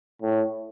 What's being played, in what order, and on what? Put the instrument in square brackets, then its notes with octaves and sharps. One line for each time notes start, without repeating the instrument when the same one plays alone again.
[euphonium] A2